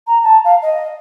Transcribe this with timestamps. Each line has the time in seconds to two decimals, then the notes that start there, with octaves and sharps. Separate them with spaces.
0.07 A#5
0.23 A5
0.44 F5
0.62 D#5